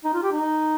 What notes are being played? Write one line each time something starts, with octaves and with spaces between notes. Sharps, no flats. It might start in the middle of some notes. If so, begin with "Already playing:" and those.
D#4
F4
G4
D#4